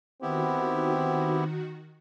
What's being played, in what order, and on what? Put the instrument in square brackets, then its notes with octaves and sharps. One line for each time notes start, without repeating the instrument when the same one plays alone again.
[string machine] D#3 F#4 [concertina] B3 E4 G4 [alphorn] C4